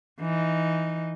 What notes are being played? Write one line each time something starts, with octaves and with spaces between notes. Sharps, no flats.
E3 D#4